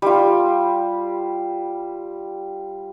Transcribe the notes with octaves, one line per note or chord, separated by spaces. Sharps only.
G3 F4